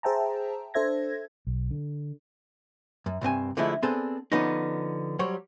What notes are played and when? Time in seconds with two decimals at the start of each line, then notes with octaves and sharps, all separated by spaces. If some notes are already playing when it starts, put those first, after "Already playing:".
0.03 G#4 C5 E5 G5 A5 A#5
0.74 D4 A4 C5 E5 G#6 A#6
1.47 B1
1.71 D3
3.06 F#2
3.21 C2 G2 C4 G#5
3.57 D3 F3 G#3 A3 D4 E4
3.83 B3 C4 D4 G#4 A4 C5
4.32 D3 F3 B3 C#4 D#4
5.19 F#3 G3 C5 C#5